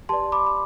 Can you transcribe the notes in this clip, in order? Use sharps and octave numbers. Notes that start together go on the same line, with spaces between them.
G4 B4 D5 A5 C6
B5 D6
B5